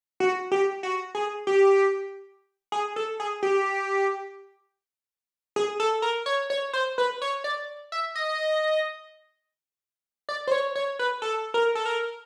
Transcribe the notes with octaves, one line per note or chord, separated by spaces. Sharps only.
F#4
G4
F#4
G#4
G4
G#4
A4
G#4
G4
G#4
A4
A#4
C#5
C#5
C5
B4
C#5
D5
E5
D#5
D5
C5
C#5
C#5
B4
A4
A#4
A4
A#4